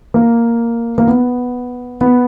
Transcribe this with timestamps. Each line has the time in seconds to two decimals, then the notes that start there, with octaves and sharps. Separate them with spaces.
0.14 A#3
0.98 A#3
1.07 B3
2.01 B3